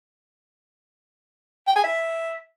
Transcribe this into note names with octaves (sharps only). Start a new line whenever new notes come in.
G5
G#5
E5